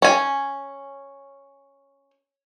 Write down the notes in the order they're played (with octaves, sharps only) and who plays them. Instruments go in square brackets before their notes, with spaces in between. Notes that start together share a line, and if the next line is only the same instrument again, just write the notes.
[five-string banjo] C#4 G#5